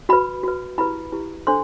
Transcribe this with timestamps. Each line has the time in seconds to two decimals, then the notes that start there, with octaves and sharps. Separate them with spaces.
0.09 F#4 B4 B5
0.43 F#4 B4
0.78 E4 G4 B4 B5
1.12 E4 G4 B4
1.47 D4 A4 C5 C6